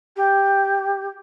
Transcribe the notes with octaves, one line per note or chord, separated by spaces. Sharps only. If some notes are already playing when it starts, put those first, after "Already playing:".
G4